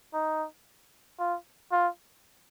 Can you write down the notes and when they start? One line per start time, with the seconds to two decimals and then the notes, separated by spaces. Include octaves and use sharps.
0.14 D#4
1.20 F4
1.72 F4